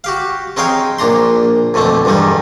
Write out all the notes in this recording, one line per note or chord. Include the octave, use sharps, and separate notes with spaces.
F#4 G4 F5
C4 D#4 G#4 C#5 F5 G5
A#1 A#2 D4 A#5 C6
F2 B2 D3 A3 C4
E2 G2 D3 G3 D#4